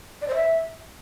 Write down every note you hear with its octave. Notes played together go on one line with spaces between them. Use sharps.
D5
C5
E5